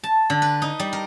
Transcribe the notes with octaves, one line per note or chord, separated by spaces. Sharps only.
A5
D3
B4
D#4
G3
A#4